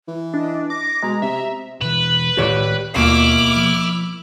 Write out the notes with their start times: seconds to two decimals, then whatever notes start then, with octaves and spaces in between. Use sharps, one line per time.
0.08 E3
0.34 D4 D#5
0.70 D6 A#6
1.03 B2 G#3 A#5
1.22 C3 E5
1.82 B2 E3 B4
2.37 A2 D#3 G#3 G4 C#5 D5
2.96 D#2 B2 A#3 E4 D6 F6
3.56 F3